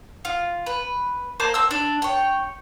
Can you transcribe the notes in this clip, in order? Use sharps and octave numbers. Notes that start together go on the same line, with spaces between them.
F4
B4
A#3 C5 A5 D6
C4 E6
D4
C#5 G5